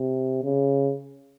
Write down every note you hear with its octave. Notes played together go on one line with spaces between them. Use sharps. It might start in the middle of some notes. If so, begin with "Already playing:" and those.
Already playing: C3
C#3